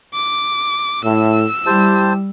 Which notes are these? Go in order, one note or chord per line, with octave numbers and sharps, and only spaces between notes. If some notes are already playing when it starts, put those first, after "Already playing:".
D6
A2 E6
G3 E4 G4 C5 A5